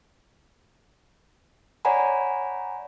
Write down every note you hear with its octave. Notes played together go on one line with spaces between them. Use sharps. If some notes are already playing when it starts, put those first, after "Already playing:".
C#5 D5 F#5 G#5 A#5 B5